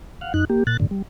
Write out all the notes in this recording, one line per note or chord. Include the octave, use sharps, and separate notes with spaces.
F5 F#5
F#2 D#4 F#6
A#3 G4
A#2 F#6 A6
F#2 A2 D3
G3